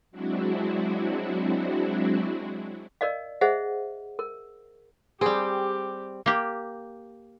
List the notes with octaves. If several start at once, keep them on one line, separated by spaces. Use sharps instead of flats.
F#3 G#3 C4 D4 E4 F#4
A#4 D5 D#5 F5
G#4 C5 D#5 E5 F#5
A#4
G3 C4 G4 G#4
A#3 G4